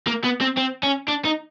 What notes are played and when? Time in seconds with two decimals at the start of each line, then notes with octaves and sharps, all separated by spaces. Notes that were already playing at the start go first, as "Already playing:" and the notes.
0.07 A#3
0.24 B3
0.41 C4
0.57 C4
0.83 C#4
1.08 D4
1.25 D#4